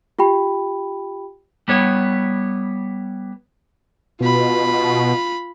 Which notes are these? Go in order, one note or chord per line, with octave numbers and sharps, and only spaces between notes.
F4 G4 G5 B5
G3 B3 C#5
B2 F4 B5